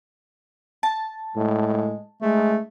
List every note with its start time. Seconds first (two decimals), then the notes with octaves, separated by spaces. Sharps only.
0.83 A5
1.36 A2 G#3
2.22 G#3 A3